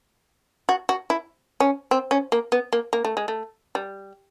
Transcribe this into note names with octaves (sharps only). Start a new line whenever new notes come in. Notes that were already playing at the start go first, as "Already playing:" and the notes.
F#4
F#4
E4
C#4
C4
C#4
A#3
B3
A#3
A#3
A3
G#3
A3
G3